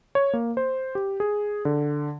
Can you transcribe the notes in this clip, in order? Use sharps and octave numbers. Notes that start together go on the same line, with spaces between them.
C#5
A#3
C5
G4
G#4
D3